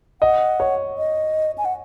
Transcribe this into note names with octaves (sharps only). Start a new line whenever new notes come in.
D#5 F#5
C#5
D#5
G#5
F#5